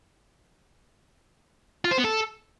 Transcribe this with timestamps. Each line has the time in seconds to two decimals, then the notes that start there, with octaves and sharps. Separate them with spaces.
1.85 F4
1.91 C5
1.98 B3
2.04 A4